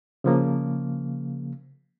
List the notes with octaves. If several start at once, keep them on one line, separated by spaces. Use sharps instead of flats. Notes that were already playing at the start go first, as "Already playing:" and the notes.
C#3 F3 A#3